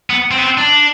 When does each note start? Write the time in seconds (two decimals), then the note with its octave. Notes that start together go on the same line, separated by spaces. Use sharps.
0.10 B3
0.31 C4
0.38 B3
0.44 C4
0.58 D4